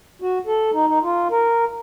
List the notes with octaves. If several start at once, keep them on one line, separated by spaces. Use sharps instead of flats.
F#4
A4
D#4
D#4
F4
A#4